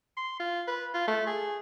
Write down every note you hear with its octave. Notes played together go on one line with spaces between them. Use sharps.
C6
F4
B4
F4
A3
G#4